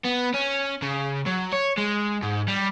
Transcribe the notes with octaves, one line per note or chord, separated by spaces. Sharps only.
B3
C#4
C#3
F#3
C#5
G#3
G#2
G3